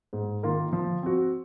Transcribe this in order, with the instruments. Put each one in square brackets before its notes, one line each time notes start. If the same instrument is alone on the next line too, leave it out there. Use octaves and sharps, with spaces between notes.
[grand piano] G#2
D#3 A#3 F4 A#4
F3
C4 F#4